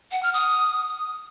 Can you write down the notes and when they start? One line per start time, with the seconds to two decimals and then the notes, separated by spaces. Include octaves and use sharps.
0.12 F#5
0.23 F6
0.34 D#6